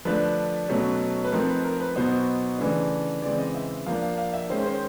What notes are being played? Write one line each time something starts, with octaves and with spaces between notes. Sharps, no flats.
D3 F3 A3 D4 B4
B2 F#3 A3 C#4
B4
F3 A3 C4 D#4 A#4
B4
A#4
B4
B2 F#3 B3 D#4 C5
C#3 E3 A3 D4
C#3 E3 G#3 C4 D5
D#5
E5
F3 A#3 D4 F5
F5
F5
E5
D#3 G#3 C#4 C5
C5